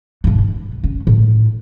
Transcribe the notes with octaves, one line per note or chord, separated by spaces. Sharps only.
G2 B2
G1
C#4
A2